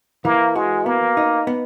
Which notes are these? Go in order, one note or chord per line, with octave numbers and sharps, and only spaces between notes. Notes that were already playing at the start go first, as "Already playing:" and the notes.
E3 A#3
G#3 F#4
A#3 B3
D#4
B3